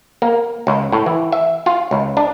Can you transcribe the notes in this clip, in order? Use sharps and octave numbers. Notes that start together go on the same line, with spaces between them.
A#3
C#2
A2
E3
E5
F4
C#2
D4